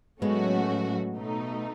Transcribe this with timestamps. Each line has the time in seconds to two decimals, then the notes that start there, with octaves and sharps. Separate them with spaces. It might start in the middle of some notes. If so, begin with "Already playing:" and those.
0.21 A2 F#3 G#3 A3 B3 C#4 F#4
1.13 B2 A3 D#4